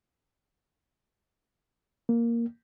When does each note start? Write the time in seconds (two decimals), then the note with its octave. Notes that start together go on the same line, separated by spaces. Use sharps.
2.09 A#3